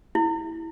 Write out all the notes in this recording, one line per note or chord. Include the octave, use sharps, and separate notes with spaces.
E4